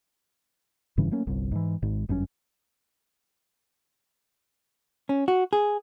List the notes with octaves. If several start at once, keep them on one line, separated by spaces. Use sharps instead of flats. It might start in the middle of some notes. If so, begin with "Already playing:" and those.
F1 G2 C#3 E3
F#3 A3 A#3 C#4
G1 C2
G#2 E3
G#1 G#2
G1 F#2 A2 C#4
C#4
F#4
G#4